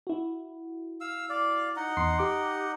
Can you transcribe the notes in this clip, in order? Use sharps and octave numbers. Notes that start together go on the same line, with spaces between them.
E4 F#4
F5 E6
D5 F5
D#4 D#5 F#5
E2 C6 C7
G4 D6